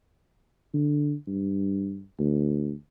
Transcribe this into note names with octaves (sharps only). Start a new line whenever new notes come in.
D3
G2
D2